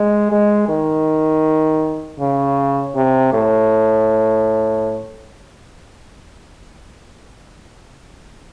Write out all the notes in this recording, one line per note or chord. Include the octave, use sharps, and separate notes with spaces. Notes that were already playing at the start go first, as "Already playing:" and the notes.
Already playing: G#3
G#3
D#3
C#3
C3
A2